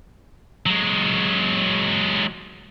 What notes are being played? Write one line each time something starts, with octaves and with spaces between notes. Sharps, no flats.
F#3 G#3